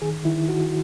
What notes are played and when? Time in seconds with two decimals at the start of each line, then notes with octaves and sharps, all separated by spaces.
0.02 D#3 G#4
0.25 D#3 E4
0.49 D#3 F#4